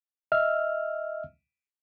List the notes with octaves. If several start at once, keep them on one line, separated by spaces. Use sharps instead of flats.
D#5 E5 E6 F6